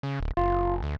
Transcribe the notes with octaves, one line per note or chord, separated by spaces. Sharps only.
C#3
D1
F#1 F4
D2